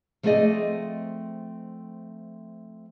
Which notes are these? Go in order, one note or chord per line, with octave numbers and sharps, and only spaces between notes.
F3 A3 C4 G#4 D5 D#5